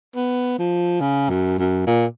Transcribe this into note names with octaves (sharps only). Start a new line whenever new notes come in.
B3
F3
C#3
F#2
F#2
A#2